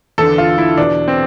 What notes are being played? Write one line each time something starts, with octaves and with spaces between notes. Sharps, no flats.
E2 D3 A4
F4
E4
E2 B2 D4
C4